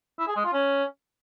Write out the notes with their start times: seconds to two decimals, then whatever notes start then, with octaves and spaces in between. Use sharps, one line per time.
0.19 E4
0.28 G#4
0.36 G#3
0.45 F4
0.53 C#4